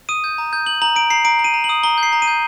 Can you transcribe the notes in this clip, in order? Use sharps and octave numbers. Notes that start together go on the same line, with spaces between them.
D#6 D#7
G6
A#5
G6
G6 F#7
A#5 F#7
A#5 D7
A#5 C7
A#5 D7
A#5
D#7
A#5
F#7
D#6
A#5 G7
G6
C7
A#5
D#7
G6